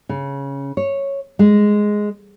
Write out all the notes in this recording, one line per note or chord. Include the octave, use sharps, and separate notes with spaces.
C#3
C#5
G#3